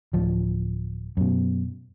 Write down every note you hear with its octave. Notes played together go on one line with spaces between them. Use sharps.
D1 F3
F#2 B2